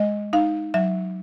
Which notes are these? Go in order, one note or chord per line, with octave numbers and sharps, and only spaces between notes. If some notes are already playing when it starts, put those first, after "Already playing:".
Already playing: G#3 D#5
D#4 F5
F#3 E5